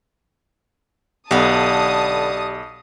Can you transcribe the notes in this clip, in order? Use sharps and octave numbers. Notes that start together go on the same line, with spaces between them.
B1 D3 B3 G4 D5 A5 D#6